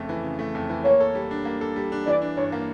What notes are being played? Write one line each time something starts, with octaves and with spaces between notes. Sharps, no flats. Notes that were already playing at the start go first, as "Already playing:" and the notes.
Already playing: F2 C#3 A3
E3
C#3
A3
F2
E3
A#3 C#5
A4
G3
D4
A#3
A4
G3
D4
E3 D5
D4
G2 C#5
A#3